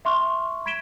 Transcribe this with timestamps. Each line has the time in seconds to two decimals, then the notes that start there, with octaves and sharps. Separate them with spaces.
0.05 E5 C6 C#6 F6
0.66 B5 G#6 B6 D7 E7 G7